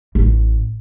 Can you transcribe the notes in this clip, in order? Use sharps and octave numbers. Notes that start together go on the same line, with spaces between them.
A1